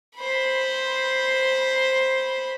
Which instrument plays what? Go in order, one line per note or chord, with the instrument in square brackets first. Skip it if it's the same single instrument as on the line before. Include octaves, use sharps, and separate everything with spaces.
[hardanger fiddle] C5 B5